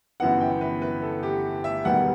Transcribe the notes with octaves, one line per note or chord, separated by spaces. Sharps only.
G1 F#2 E3 B3 F#5
G5
B4
B4
A4
G4
E5
E1 D#2 D#3 G3 B3 F#5